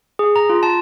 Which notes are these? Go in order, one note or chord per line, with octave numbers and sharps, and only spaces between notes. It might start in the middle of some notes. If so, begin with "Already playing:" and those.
G#4
A#5
F4
A5